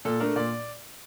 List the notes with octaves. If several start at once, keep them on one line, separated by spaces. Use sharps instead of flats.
A#2 A4
A3 D4 A#4
A#2 D5